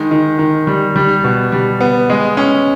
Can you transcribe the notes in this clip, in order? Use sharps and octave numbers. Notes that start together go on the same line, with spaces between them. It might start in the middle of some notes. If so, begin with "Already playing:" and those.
Already playing: D#3 G#3
D#3
D#3
G3
G3
B2
G3
B3
G#3
C#4